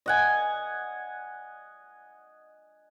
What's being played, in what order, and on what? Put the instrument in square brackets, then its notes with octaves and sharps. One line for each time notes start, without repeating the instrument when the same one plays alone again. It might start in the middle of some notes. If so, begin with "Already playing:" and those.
[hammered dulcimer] D#5 F#5 G#5